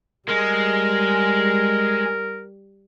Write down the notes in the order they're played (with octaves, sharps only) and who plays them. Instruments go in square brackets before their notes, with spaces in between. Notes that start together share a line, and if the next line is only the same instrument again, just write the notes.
[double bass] G3 [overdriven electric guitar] G#3 [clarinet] A#4